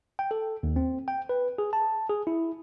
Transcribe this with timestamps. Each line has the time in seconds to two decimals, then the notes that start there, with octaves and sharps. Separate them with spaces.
0.19 G5
0.31 A4
0.63 D#2
0.76 C4
1.08 G5
1.29 B4
1.58 G#4
1.73 A5
2.10 G#4
2.27 E4